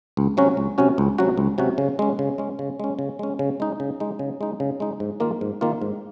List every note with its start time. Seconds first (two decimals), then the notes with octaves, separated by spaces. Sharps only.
0.17 C#2
0.37 C3 F#3 C#4 F#4
0.57 C#2
0.78 C3 F#3 C#4 F#4
0.98 C#2
1.18 C3 F#3 C#4 F#4
1.37 C#2
1.58 C3 F#3 C#4 F#4
1.78 C#3
1.99 G#3 C#4
2.19 C#3
2.38 G#3 C#4
2.59 C#3
2.80 G#3 C#4
2.99 C#3
3.19 G#3 C#4
3.39 C#3
3.60 G#3 D#4
3.80 C#3
4.00 G#3 D#4
4.19 C#3
4.41 G#3 D#4
4.60 C#3
4.80 G#3 D#4
5.00 G#2
5.20 D#3 A#3 F4
5.41 G#2
5.61 D#3 A#3 F4
5.82 G#2